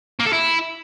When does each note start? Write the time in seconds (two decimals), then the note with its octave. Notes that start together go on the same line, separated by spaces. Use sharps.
0.20 A#3
0.26 A4
0.33 E4